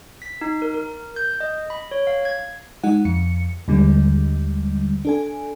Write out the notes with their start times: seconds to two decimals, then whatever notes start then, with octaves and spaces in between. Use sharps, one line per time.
0.22 B6
0.41 D#4
0.62 A#4
0.74 A#4
1.16 G6
1.40 D#5
1.70 B5
1.91 C#5
2.07 F5
2.25 G#6
2.83 G#3 D#4 F#5
3.05 F2 C#7
3.68 D#2 D3 G3 G#3
5.05 D4 A4 G#5